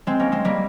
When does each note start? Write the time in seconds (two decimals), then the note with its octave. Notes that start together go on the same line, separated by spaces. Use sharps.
0.07 G#3 C4
0.20 A#3 C#4
0.32 G#3 C4
0.45 G3 A#3